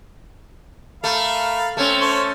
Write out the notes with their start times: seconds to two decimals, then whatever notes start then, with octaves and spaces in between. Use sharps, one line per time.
1.04 A3 A#4 F5 B5
1.77 A3 C4 C#4
2.01 A4 C5 C#5